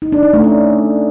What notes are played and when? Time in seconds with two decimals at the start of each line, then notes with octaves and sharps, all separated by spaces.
0.02 D#4
0.12 D4
0.23 D#4
0.33 A3
0.44 C#4